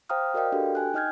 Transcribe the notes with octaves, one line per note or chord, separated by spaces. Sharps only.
C5 F5 G5 A#5 D#6 F6
F#4 A#4 D5 D#5 F5 G5
D4 F#4 G4 A4 B4
G5 G#5 F#6
D#4 D#5 F6 G6 G#6